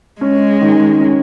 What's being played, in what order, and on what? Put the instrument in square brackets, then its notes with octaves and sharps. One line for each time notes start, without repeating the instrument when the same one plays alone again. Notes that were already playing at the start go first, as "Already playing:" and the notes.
[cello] G#3 [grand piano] C#4
[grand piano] D#3
C#4